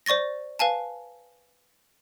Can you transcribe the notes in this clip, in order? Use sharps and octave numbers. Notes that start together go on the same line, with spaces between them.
C5 D5 C#6 A6 A#6
B4 F5 G#5 A5